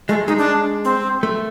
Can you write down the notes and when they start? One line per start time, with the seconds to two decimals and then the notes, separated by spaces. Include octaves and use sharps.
0.08 G#3 A3
0.28 G#3 D#4
0.38 D4
0.85 C4
1.23 A3